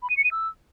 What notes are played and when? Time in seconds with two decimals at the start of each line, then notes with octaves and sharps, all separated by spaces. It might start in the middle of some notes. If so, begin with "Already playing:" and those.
0.02 B5
0.10 D#7
0.17 C#7
0.24 D#7
0.31 E6